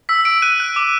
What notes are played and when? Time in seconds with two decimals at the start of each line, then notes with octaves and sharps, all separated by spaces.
0.09 E6 B6
0.25 E6 D7
0.42 F#6 D#7
0.60 F#6
0.76 D6